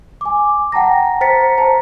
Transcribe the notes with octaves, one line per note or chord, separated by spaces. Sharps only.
G#5 D6
F#5 G5 A5 A#5 A#6
C5 A#5 A6 B6 C#7
C5 A5 A#5